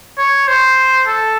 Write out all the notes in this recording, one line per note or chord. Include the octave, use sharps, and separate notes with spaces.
C#5
C5
A4